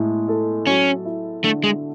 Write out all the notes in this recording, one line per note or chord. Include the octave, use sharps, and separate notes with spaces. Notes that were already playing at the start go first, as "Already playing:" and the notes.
Already playing: A2 G#3
A4
F#3 C#4
E4
D3 A3
G#3